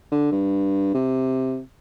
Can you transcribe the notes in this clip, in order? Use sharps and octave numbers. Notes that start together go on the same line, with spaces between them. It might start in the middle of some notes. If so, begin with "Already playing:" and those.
D3
G2
C3